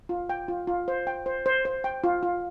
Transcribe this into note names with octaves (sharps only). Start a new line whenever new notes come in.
F4
G5
F4
F4
C5
G5
C5
C5
C5
G5
F4
F4